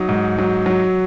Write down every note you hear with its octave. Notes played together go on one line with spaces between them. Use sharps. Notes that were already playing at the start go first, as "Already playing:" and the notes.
Already playing: F#3 D#4
G#2
F#3
F#3